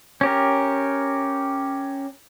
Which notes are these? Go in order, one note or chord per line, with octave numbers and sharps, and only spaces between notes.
C#4 G4 A#4